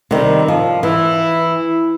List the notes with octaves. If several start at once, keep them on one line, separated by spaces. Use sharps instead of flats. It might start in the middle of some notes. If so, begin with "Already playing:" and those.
C3 D#3 G3
F3
E3 E4